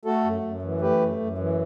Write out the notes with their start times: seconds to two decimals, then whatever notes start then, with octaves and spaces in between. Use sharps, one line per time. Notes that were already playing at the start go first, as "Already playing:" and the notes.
0.05 A3 F#4 A4
0.24 F#2
0.43 F#2
0.62 E3
0.81 A3 G4 B4
1.00 F#2
1.19 F#2
1.38 E3